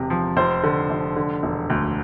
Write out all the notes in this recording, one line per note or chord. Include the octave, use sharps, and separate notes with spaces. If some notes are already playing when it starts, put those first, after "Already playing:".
Already playing: E1 C3
F3
F1 C5
D3
F1
D3
E1
D2